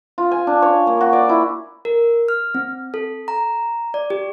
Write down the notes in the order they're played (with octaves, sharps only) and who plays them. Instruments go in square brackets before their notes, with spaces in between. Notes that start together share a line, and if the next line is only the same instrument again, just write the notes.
[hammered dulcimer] F4
G#5
D4
C#5
A#3
F#4
D5
E4
[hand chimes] A#4
F6
C4
A4
A#5
D5
G4